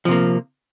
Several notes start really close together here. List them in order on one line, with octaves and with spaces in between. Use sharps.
F3 C3 A#3